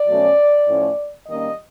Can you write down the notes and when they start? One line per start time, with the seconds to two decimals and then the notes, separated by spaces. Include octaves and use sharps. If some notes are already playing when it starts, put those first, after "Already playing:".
Already playing: D5
0.08 B2 F#3 A3 C#4
0.68 A2 F3 A3 C#4
1.27 D#3 G3 A#3 C#4 D#5